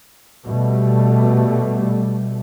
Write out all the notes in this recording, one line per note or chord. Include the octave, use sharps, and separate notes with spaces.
B2 G3 A3